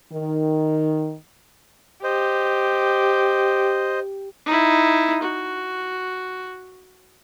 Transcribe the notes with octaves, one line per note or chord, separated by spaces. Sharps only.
D#3
G4 C5 D#5
D#4 E4
F#4